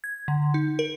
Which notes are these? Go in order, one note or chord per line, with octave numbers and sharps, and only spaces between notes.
G#6
D3
D#4
A#4